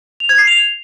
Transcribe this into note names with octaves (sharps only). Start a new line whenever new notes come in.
F7
G#6
C7
F7